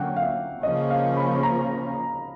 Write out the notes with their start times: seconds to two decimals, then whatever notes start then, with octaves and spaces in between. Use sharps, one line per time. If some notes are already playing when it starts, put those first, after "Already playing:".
Already playing: D3 F#3 A#3 C#4 F#5 G5
0.16 F5
0.22 E5
0.62 C#3 F3 A#3 C#4 D#5
0.90 F5
1.17 B5
1.43 A#5